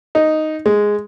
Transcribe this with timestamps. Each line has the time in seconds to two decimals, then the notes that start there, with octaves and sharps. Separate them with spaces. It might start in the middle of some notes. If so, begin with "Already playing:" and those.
0.15 D#4
0.66 G#3